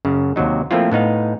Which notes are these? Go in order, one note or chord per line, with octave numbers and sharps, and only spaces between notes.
F#2 C#3
D#2 C3 F#3 D#4
F3 A3 A#3 C4 E4 F4
A2 B3 D#4 F5